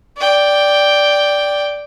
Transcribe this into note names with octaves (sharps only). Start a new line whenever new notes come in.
D5 G5